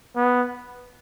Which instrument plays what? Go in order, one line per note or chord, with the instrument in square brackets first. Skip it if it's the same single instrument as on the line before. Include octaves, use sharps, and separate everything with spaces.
[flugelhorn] B3